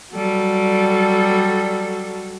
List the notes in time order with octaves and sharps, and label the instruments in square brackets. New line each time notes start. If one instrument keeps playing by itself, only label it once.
[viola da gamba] F#3 G3 A4